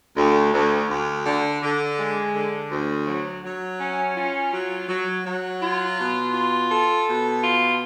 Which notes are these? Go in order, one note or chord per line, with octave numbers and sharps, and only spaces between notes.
D2
D2
D2
D3
D3
G#3
D3
D2
F#3
F#3
C#4
F4
F#3
F#3
F#3
F4
B2
F4
A4
B2
F4